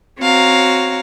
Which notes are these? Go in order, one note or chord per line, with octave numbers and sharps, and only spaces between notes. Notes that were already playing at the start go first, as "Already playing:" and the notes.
C4 F#4 C#5 F5 A#5